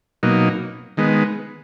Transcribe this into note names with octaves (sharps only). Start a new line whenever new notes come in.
B2 F#3 A#3 D#4
D#3 G#3 B3